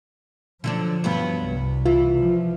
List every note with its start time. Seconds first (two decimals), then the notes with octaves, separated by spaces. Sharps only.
0.64 D3 F3 F#3 D4
1.04 G2 F#3 B3
1.41 C2
1.86 E3 F4
2.19 F3